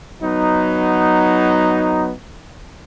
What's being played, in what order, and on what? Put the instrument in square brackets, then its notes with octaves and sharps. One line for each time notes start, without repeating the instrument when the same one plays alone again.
[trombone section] F#3 B3 D#4